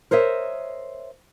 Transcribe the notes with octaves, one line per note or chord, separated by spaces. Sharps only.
A#4 C5 C#5 D#5 E5